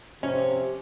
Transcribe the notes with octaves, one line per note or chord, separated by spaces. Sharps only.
C3 F3 C#4